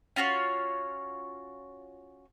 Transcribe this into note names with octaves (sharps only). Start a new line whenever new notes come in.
C#4 F4 F#4 C#5